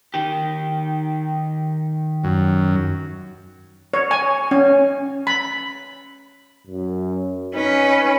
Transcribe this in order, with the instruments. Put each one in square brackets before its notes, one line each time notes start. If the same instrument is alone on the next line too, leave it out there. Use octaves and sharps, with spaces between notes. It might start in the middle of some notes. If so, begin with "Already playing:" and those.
[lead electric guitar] D#3 G4
[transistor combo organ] F#2
[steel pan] C#5
G#5
C#4
B5
[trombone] F#2
[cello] C#4 B4 [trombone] D#4